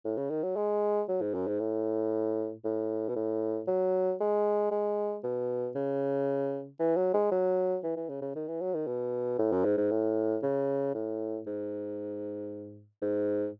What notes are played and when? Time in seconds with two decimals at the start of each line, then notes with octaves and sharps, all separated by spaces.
0.05 A2
0.17 C#3
0.30 D#3
0.43 F#3
0.56 G#3
1.08 F#3
1.21 G#2
1.34 F#2
1.47 G#2
1.60 A2
2.64 A2
3.09 B2
3.16 A2
3.67 F#3
4.20 G#3
4.71 G#3
5.24 B2
5.75 C#3
6.79 E3
6.96 F#3
7.14 G#3
7.31 F#3
7.83 E3
7.96 E3
8.09 C#3
8.22 C#3
8.35 D#3
8.48 E3
8.61 F#3
8.74 D#3
8.87 B2
9.39 A2
9.52 F#2
9.65 G#2
9.77 G#2
9.91 A2
10.43 C#3
10.94 A2
11.46 G#2
13.02 G#2